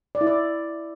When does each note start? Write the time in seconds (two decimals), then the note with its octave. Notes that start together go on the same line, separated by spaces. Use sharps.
0.15 D5
0.21 E4
0.27 D5